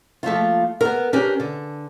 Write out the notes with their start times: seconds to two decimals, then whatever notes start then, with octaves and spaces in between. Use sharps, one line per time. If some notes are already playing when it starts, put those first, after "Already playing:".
0.23 F3 A3 A#3 F4
0.81 B3 A#4
1.13 C#4 D4 G4 A#4
1.40 D3